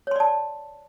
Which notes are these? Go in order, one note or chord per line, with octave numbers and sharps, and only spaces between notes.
C#5 D5 A5 C6